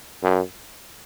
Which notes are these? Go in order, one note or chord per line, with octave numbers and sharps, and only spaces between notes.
F#2